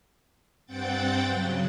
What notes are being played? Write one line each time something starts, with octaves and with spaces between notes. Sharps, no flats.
G2 C4 F#5 G5 G6 A6
C#3 F#3